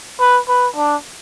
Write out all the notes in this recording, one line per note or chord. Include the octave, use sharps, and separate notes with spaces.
B4
B4
D4